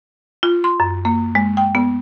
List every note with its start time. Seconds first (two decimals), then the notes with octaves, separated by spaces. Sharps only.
0.43 F4
0.64 C6
0.80 F#2
1.05 A#3
1.35 G#3
1.57 G5
1.75 B3